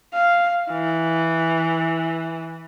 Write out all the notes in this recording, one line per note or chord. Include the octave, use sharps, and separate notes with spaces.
F5
E3